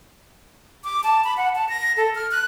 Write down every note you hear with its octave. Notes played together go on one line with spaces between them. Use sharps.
D6
A5
B5
F#5
A5
A#6
A4
F6
F#6